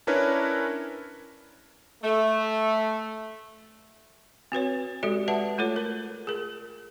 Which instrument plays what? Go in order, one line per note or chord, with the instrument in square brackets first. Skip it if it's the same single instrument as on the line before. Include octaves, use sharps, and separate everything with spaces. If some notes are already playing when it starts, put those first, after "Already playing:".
[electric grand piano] C#4 D4 E4 A#4 B4 C#5
[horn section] A3
[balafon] C4 F#4 B4 C#5
G#3 F#4 G4 A4 D5
B4 E5 F#5 A5
A3 F4 A4 C#5
A#4
G#4 A#4